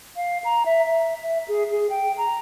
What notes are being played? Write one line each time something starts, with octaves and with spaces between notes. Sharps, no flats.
F5
A#5
E5
E5
E5
G#4
G#4
G5
A#5